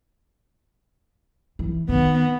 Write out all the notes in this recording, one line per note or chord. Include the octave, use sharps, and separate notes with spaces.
E3
D#3 B3